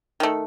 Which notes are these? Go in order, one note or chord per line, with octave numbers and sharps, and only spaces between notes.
D#3 A3